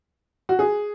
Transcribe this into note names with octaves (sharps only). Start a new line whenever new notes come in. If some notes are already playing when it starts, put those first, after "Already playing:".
F#4
G#4